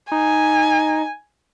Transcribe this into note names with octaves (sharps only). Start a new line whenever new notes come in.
D#4 G#5